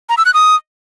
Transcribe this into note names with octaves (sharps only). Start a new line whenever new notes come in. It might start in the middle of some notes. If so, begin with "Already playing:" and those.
A#5
E6
F#6
D#6